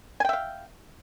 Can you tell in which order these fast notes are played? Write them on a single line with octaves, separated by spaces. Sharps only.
G#5 G5 E5 F5